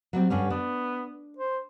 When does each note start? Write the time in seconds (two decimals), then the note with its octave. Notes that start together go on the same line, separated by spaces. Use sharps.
0.13 F#3 G3 C4
0.30 G2 D3 G3 C#4
0.50 B3 D4
1.38 C5